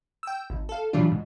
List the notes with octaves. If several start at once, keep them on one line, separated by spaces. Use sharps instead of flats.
G5 E6
G#1
A4 F5
A#2 E3 F#3 G3 D4 F4
G#2